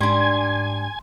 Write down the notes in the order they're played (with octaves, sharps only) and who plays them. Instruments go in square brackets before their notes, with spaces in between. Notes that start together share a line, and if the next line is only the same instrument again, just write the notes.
[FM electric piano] G#2 [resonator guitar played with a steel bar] G3 D4 [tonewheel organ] G#5 G#6 [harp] C6